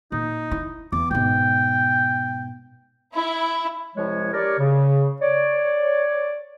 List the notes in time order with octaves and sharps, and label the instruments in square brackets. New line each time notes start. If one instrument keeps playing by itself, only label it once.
[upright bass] A#2 [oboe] D#4
[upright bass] E4
[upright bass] E2 [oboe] D6
[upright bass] G#2 B2 [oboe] G5
[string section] E4
[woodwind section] C2 F3 G#3 E4 C#5
D4 G4 A#4 C#5 D5
C#3
C#5 D5